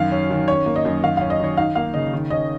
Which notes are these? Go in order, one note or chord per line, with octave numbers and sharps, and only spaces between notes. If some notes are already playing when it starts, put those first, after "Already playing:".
Already playing: F#2 D#3 F5
C#4
D#3
C#4 C#5
A#3
D#5
F#2
D#3 F5
C#4 F5
D#5
D#3 C#5
D#4 F5
A#3 F5
C#3 D#5
D#3
C#4 D#5